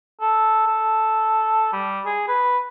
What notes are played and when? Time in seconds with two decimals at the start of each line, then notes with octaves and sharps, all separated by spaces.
0.21 A4
0.67 A4
1.73 G3
2.06 G#4
2.28 B4